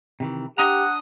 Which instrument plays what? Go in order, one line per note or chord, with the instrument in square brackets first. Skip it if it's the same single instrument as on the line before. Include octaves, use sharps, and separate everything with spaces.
[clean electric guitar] C3 D#3 E3
[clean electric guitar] D4 A#5 [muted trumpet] G4 [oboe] F#5 [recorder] D#6